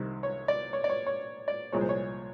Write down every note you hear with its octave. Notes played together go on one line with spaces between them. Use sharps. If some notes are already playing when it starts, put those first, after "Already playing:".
Already playing: C2 C3 D#3
C#5
D5
C#5
D5
C#5
C#5
D5
C2 A#2 F3 G#3 C#5
C5
C#5